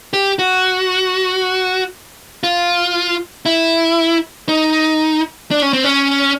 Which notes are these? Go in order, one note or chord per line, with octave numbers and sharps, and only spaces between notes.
G4
F#4
F4
E4
D#4
D4
C#4
C4
C#4